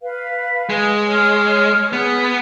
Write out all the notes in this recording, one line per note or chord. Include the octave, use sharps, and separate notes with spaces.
B4 F5
G#3
C#5 F6
B3 G#4 B4